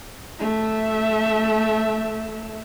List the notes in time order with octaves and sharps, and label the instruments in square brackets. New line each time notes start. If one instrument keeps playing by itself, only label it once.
[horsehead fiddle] A3 E5